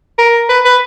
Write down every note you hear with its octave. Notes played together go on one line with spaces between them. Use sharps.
A#4
B4
B4